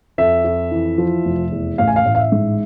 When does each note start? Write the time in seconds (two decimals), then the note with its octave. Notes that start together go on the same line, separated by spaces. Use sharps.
0.18 F2 E5
0.44 F2
0.71 E3
0.98 F3
1.25 F1
1.52 E2
1.78 A1 F5
1.88 G#5
1.96 F5
2.05 A1
2.15 F5
2.19 E5
2.32 G#2